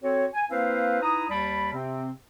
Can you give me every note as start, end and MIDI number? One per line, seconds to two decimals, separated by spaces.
0.03 0.26 60
0.03 0.26 66
0.03 0.26 69
0.03 0.26 73
0.34 0.45 80
0.50 1.01 58
0.50 1.01 60
0.50 1.01 64
0.50 1.01 71
0.50 1.01 72
0.50 1.01 77
1.02 1.25 63
1.02 1.25 64
1.02 1.25 71
1.02 1.25 82
1.02 1.25 87
1.30 1.70 39
1.30 1.70 55
1.30 1.70 81
1.30 1.70 83
1.73 2.10 48
1.73 2.10 60